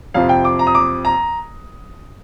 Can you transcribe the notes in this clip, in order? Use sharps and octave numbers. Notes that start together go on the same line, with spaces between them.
F2 C3 F3 C4 F5
G5
D6
A#5
D#6
D6
A#5